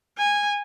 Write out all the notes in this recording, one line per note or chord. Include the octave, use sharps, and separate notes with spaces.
G#5